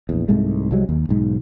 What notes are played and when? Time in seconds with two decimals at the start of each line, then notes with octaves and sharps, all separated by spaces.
0.09 A#1 E2
0.28 C2 G#2 G#3 A3
0.71 C2 C3 F#3 G#3
0.89 D#2
1.09 B1 G#2